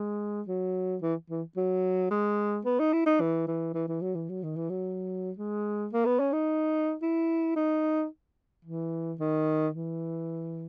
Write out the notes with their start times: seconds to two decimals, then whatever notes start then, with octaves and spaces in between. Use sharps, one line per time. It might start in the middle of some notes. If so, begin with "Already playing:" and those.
Already playing: G#3
0.47 F#3
1.02 E3
1.30 E3
1.56 F#3
2.11 G#3
2.65 B3
2.79 D#4
2.93 E4
3.06 D#4
3.20 E3
3.47 E3
3.74 E3
3.88 E3
4.02 F#3
4.15 E3
4.29 F#3
4.43 D#3
4.56 E3
4.70 F#3
5.38 G#3
5.93 A#3
6.06 B3
6.19 C#4
6.33 D#4
7.02 E4
7.56 D#4
8.65 E3
9.19 D#3
9.74 E3